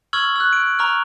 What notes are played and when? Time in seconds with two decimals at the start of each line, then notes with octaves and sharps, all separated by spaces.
0.13 C#6 E6 F6 G#6 F#7
0.36 E6 F#6
0.53 D7
0.79 A#5 C#6 F6